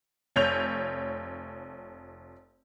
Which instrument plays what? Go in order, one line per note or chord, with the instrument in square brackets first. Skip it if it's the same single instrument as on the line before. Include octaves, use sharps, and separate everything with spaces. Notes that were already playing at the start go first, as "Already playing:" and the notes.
[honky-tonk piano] F1 C#5 G6 F7